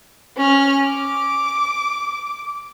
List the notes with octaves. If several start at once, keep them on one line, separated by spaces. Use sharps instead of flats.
C#4 F6
D6